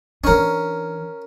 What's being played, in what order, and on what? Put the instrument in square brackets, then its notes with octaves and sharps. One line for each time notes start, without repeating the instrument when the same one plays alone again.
[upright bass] E3 D4 [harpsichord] C#4 A#4